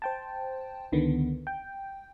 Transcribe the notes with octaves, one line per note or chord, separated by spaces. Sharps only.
C5 G5 A5
C#2 D3 D#3 B3
G5